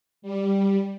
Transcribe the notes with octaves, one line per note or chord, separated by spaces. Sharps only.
G3